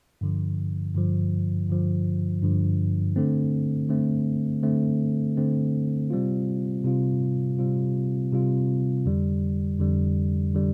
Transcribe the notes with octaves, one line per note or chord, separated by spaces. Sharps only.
G2 D3 F3
G2 D3 F3
G2 D3 F3
G2 D3 F3
D3 A3 C4
D3 A3 C4
D3 A3 C4
D3 A3 C4
C3 G3 C4 F4
C3 G3 C4 F4
C3 G3 C4 F4
C3 G3 C4 F4
F2 D3 G3
F2 D3 G3
D3 G3